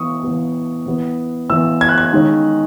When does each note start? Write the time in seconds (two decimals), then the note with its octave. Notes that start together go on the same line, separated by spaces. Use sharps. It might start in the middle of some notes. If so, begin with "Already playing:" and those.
Already playing: E3 B3 C#6 D#6
0.23 E3 B3
0.86 E3 B3
1.50 E3 B3 E6
1.81 G#6
1.89 F#6
1.98 G#6
2.13 D#3 G#3 C#4